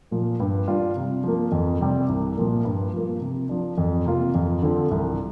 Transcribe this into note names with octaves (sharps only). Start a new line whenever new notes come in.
A#2 F3 A#3
G2
G3 D4 F4
C3
F3 A#3
F2
C3 G3 C4
C2
A#2 F3 A#3
G2
F3 A#3
C3
F3 D4
F2
C3 A#3 F4
F2
D3 F3 C4
C2